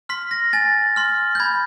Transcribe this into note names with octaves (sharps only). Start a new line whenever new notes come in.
C6 F6 B6
A#6
G#5 A6
C6 F6
G6
B5 G#6